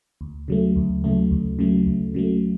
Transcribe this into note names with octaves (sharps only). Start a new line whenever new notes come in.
D2
C#3 F#3 A3
D2
C#3 F#3 A3
D2
C#3 F#3 A3
D2
C#3 F#3 A3